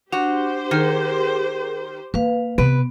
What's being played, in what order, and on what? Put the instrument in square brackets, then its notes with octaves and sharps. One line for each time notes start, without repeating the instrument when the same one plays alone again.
[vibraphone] D4 [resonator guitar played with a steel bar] F#4 [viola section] G4 C5
[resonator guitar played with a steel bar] D#3 [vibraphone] G#4 A#4
[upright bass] A#3 [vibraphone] B4 F5
[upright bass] C3 [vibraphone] B3 [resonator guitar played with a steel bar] B4